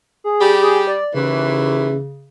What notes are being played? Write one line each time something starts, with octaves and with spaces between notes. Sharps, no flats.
G#4
G3 G4
G#4
D5
D#2 C#3 E3